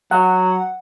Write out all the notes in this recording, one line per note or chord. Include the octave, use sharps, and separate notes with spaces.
F#3 F#5